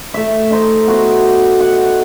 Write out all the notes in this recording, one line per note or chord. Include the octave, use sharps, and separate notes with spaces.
A3 E5
D#4 C5 D#5
B3 F#4 C5
F#5